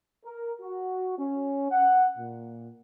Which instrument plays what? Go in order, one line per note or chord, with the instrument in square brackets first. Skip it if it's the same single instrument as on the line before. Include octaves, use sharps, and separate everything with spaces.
[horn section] A#4
F#4
C#4
F#5
A#2